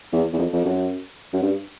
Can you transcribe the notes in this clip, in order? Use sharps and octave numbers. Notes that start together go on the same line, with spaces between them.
E2
E2
F2
F2
F#2
F#2
G2